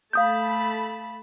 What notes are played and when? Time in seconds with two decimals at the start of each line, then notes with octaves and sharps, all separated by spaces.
0.13 A3 F5 A5 B5 D#6 G6